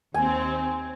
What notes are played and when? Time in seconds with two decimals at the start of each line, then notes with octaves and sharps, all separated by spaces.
0.14 D#2 C4 G#5